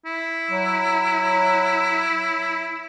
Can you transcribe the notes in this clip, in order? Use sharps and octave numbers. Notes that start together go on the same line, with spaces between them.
E4
F#3